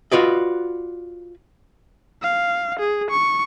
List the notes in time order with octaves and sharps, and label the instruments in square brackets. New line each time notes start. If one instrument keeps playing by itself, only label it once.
[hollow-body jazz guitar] F4 F#4 B4 D5 D#5
[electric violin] F5
G#4
C#6